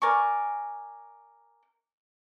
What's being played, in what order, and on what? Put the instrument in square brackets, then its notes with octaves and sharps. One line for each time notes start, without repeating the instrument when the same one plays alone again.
[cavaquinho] A#4 D5 G#5 C#6